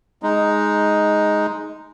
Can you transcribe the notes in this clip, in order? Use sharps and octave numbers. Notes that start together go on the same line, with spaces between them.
G#3 D#4